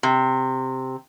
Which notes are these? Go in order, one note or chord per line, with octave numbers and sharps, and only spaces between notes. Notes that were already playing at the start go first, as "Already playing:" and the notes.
C3